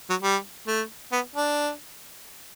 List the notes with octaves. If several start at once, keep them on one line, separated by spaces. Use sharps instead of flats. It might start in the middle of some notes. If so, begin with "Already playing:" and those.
F#3
G3
A3
B3
D4